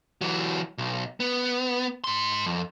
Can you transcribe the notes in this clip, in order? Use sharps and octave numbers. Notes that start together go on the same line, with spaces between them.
E3 F#3
B1
B3
G#2 C6
F2